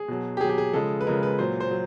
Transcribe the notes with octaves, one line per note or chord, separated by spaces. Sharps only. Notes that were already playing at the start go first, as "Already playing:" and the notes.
Already playing: G#4
B2 F#3
G4
B2 F#3 G#4
G4
G#4
C#3 F3 G#3 A4
B4
C#3 F3 G#3 A#4
B4
A#2 F#3 C5
C5
F#3